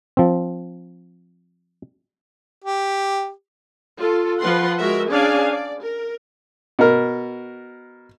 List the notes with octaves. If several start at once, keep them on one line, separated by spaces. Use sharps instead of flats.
F3 C4
G4
F4 A4
F3 F4 B4 F#5 C6
G#3 F#4 A#4 E5
C#4 D4 G#4 D5 F5 G#5
D5
A#4
B2 A#4